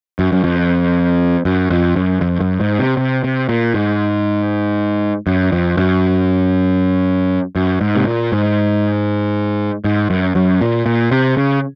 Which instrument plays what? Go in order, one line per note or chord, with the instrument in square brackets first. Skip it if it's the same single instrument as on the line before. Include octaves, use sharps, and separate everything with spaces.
[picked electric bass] F#2
F#2
F2
F#2
F2
F#2
F2
F#2
G#2
C3
C3
C3
A#2
G#2
F#2
F2
F#2
F#2
G#2
C3
A#2
G#2
G#2
F#2
F#2
A#2
A#2
C3
C#3